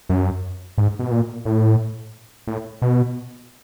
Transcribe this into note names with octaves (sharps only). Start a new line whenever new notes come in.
F#2
G#2
B2
A#2
A2
A2
B2